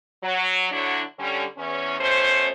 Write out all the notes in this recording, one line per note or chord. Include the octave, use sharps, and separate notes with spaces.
F#3
D3 F#3 D4 E4 F#4 C#5
D3 G3 C#4
E2 C#4
B2 A3 C#4 C5